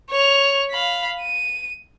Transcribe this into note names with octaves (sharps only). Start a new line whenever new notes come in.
C#5 F7
F5 B5
D#7